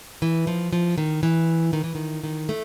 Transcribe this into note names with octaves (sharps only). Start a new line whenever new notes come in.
E3
F3
F3
D#3
E3
D#3
E3
D#3
D#3
A3